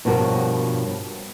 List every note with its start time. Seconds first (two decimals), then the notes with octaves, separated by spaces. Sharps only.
0.05 G2 B2 F3 F#4 A#4 C#5